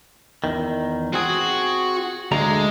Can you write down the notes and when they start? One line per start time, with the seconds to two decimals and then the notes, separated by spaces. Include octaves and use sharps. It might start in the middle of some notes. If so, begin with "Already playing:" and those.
0.44 E2 D#3
1.13 C4 F#4 G#4
2.32 D2 D3 G#3 A#5